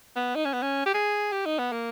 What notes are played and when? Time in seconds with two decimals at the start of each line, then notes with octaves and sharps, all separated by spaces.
0.16 B3
0.35 D#4
0.45 C#4
0.53 B3
0.62 C#4
0.86 G4
0.94 G#4
1.32 G4
1.46 D#4
1.59 B3
1.72 A#3